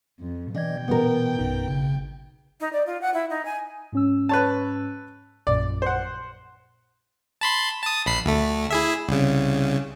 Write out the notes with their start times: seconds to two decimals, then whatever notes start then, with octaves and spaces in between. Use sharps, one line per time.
0.20 F2
0.55 B2 E3 D4 D#5 G5 G#6
0.88 A#2 E3 B3 A#4
1.39 A#1 F#2 D#4
1.68 G#1 C#3
2.60 D#4
2.73 D5
2.86 F4
3.02 F#5
3.14 E4
3.30 D#4
3.45 G#5
3.92 G#2 C#4 E6
4.29 B4 C#5 A5
5.47 A#1 F#2 A#2 D5
5.82 C5 F#5
7.41 A5 B5 C6
7.83 A5 D#6
8.06 A#1 B5 C7
8.26 D2 A3
8.70 E4 G#4 E5
9.09 C2 C#3